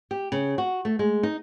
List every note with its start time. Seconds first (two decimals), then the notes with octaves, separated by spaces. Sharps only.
0.11 G4
0.32 C#3
0.58 F#4
0.85 A3
0.99 G#3
1.23 D#4